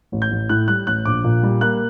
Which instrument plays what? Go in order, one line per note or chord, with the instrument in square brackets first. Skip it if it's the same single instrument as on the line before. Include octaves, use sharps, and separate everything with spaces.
[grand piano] A1
G6
A1
A2 F#6
G3 F#6
A1 F#6
A#1 D6
A#2
G3
A#3 F#6